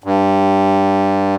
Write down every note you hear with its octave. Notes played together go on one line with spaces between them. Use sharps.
G2